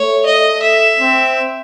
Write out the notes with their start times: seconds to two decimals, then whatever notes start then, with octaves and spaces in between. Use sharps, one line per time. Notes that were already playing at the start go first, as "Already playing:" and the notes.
Already playing: A3 C#5
0.26 D#5
0.62 E5
0.99 C4